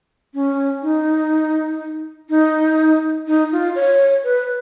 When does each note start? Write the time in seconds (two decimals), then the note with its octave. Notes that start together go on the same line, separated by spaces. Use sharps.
0.34 C#4
0.82 D#4
2.29 D#4
3.27 D#4
3.52 F4
3.75 C#5
4.24 B4